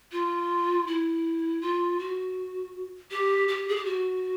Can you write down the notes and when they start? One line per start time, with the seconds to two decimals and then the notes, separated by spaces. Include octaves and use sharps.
0.12 F4
0.87 E4
1.61 F4
1.99 F#4
3.11 G4
3.48 G4
3.68 G#4
3.76 G4
3.85 F#4